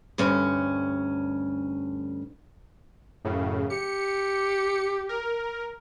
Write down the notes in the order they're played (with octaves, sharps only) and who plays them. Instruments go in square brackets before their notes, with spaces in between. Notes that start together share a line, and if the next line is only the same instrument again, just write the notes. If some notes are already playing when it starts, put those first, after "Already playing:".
[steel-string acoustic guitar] D2 G2 C#4
[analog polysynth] F#2 A2 C#3
[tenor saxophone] G4 [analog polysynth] C#7
[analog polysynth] A#4